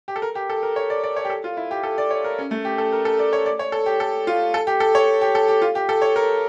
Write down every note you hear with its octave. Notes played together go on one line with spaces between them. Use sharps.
G4
A4
A#4
G4
A4
A#4
C#5
D5
D5
C#5
G4
A4
F4
E4
G4
A4
D5
C#5
A#4
C#4
A3
G4
A4
A#4
A4
D5
C#5
D5
C#5
A4
G4
A4
F4
A4
G4
A4
C#5
G4
A4
G4
F4
G4
A4
C#5
A#4